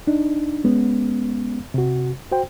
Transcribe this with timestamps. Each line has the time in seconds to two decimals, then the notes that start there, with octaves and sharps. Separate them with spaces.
0.07 D4 D#4
0.64 G#3 B3 C#4
1.74 C3 F#4
2.32 F#4 C5 G5